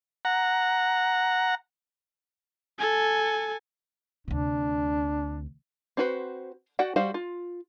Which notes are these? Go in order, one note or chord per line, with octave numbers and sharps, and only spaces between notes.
F#5 A#5
A4 G#5
D2 C3 D4
C4 D4 F#4 B4 C5
F#4 D5 F#5 G5
G3 F#4 C5 F5
F4